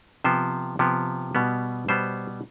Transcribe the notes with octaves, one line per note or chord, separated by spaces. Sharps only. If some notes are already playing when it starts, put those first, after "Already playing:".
C3 F3 B3 C5
C3 F3 B3
B2 G3 B3
B2 G3 B3 C5